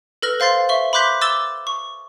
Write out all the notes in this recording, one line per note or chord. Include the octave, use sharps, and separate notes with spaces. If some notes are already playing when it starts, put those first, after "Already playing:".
A4 B4 F6 A#6 F#7
C5 F5 C6 A6 C7
E5 C#6 G7
B5 C6 D6 F#6 G6 B6
D6 E6 A6 E7 G7
C#6